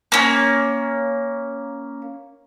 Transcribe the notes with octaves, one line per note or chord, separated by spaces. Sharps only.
A#3 C#4